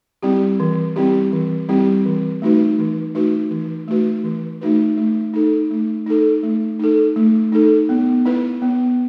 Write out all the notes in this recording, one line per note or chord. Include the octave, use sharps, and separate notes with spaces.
G3 C4 E4 G4
E3
G3 C4 E4 G4
E3
G3 C4 E4 G4
E3
A3 D#4 F#4 B4
E3
A3 D#4 F#4 B4
E3
A3 D#4 F#4 B4
E3
A3 D#4 F#4 B4
A3
D#4 A4
A3
D#4 A4
A3
D#4 A4
A3
D#4 A4
B3
E4 B4
B3